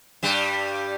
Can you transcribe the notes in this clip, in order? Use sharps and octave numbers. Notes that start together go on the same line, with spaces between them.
G2 G3